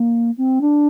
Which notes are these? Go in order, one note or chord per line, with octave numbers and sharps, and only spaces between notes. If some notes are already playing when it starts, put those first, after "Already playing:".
Already playing: A#3
C4
D4